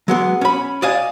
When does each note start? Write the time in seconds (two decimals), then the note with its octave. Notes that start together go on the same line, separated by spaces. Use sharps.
0.08 F#3 G#3 B3
0.41 C#4 B5
0.82 D5 D#5 F5 G#5